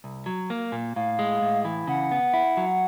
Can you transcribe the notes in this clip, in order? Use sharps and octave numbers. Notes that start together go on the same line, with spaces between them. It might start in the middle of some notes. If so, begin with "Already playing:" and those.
C2
F#3
A#3
A#2
A2 F5
G#3
A2
E3
C#3 F#5
B3
E4
F#3